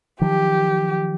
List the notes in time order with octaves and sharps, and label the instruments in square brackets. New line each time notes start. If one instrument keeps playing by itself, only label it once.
[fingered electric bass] D#3 F3 F#3 [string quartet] G4